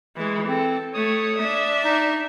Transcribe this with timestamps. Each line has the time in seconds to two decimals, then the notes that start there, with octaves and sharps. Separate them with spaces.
0.17 E3 G#3
0.48 C4 A4
0.94 A3 C#5 D#6
1.39 D4 E5
1.84 D#4